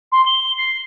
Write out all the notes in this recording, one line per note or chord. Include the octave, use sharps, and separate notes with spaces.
C6
G7
C7